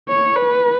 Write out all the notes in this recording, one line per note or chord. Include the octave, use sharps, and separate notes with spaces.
C#5
B4